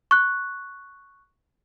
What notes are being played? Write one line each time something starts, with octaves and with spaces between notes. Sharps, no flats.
C#6 F#6